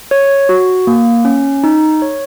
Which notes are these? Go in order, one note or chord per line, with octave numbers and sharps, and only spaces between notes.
C#5
F#4
A#3
C#4
D#4
C#5